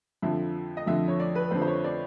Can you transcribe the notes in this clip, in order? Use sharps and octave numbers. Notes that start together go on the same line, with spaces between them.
F2 D3 F3 E5
D#5
F2 D3 F3 E5
C#5
D5
B4
F2 D3 F3 C5
C5
C#5
D5